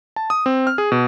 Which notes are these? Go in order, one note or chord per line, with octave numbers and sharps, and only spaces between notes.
A5
D#6
C4
F6
G#4
B2